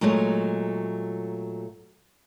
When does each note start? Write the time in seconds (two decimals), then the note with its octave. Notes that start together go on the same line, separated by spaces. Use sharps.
0.01 A#2 F#3 G#3 A3 C#5